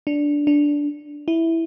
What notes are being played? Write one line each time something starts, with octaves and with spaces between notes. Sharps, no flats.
D4
D4
E4